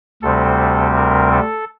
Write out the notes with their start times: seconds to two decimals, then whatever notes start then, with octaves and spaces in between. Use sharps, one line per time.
0.22 D2 C3 G3 C4 A4
0.96 A#4
1.32 A4